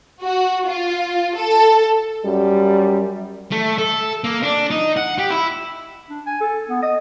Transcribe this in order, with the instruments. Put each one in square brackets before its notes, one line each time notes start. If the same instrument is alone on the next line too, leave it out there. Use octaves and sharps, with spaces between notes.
[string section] F#4
F4
A4
[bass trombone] F#2 [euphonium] G3
[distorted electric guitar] A3
A4
A#3
D4
D#4
F#5
G4
E4
[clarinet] D4
G#5
A4
B3
D#5